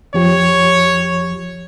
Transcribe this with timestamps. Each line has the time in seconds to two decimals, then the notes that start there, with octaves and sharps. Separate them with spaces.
0.14 F2 F3 G4 C#5